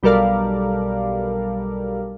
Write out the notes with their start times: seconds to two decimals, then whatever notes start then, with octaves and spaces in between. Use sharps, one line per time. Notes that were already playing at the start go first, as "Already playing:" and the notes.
0.03 B1 G3 A4 A#4 D5 F5